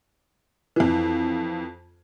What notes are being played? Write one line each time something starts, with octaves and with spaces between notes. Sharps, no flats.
F2 E3